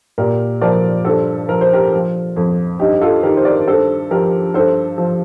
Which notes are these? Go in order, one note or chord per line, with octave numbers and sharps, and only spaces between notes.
A#2 G4 A#4
F3 A#4 D5
G2 A4 C5
F3 A#4
C5
G4 A#4
F3
F2
G2 D#4 G4
F4 A4
D#3 G4 A#4
C5
A#4 D5
G2 A4 C5
F3 G4 A#4
G2 A4 C5
F3